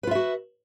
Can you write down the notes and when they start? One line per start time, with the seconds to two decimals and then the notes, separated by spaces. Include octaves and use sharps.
0.03 B4
0.07 F4
0.11 E5
0.15 F#4